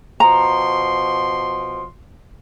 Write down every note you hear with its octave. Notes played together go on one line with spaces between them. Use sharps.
B2 F3 A#5 C6